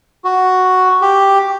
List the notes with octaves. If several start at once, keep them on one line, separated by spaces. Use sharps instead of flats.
F#4
G4